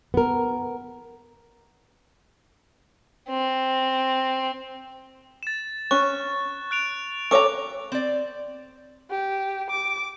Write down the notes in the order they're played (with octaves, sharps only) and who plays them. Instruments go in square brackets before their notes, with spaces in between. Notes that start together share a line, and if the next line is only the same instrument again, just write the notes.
[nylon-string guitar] B3 A#4
[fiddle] C4
[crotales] A6 E7
[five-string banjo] C#4 [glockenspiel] C#6 [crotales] F#6
[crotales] F#6 D7 F7
[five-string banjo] A4 C#5 A#5 [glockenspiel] C#6 D6
[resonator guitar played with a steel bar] C4 D5
[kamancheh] G4
D6